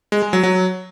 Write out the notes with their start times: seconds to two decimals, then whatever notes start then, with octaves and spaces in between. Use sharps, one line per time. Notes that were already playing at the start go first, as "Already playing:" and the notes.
0.12 G#3
0.23 G#3
0.33 F#3
0.43 F#3